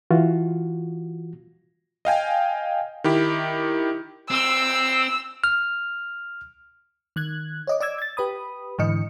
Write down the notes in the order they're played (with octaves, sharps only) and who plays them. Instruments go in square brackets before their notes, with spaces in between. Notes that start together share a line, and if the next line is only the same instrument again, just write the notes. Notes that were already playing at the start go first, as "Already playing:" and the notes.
[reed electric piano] E3 F4 F#4
[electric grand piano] D#5 F5 G5 G#5
D#3 E4 G4
[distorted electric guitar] C4 [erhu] E6
[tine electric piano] F6
[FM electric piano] D#3 F#6 G#6
C#5 D#5 D6
D5 D6 E6 G#6
G#6 A6
G4 B4 B5 D#6
G#2 D3 E3 D#5 C#7